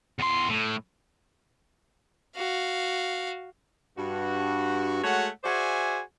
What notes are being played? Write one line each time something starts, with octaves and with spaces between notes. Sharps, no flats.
E2 C6
A2
F#4 F5
G2 F#4
G#3 A3 F#4 C#5 F#5
F#4 G#4 C5 D5 E5 G#5